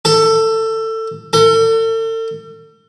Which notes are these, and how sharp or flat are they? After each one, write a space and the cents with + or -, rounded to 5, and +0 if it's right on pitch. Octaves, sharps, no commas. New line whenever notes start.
A4 +20
A4 +40